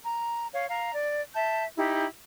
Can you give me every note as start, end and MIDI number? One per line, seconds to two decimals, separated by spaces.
0.03 0.46 82
0.53 0.68 73
0.53 0.68 77
0.69 0.93 77
0.69 0.93 82
0.94 1.21 74
1.34 1.64 76
1.34 1.64 81
1.34 1.64 91
1.76 2.05 63
1.76 2.05 64
1.76 2.05 67